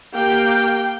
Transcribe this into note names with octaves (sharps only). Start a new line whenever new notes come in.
A#3 G4 G5